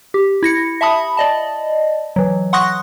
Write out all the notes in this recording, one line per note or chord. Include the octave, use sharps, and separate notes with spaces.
G4
E4 A#6 C#7
E5 A5 B5 D#6
D5 D#5 A5
E3 F#3
F#5 C6 C#6 D#6 F#6 A#6